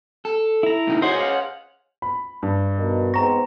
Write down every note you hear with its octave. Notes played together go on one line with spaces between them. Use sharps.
A4
E4 A#5
A2 C#3 D#4
F#4 G#4 C5 C#5 D#5
C5 F5 F#5
B5
G2
B2 D#3
G#2 B3 C4 A#5 C#6 A#6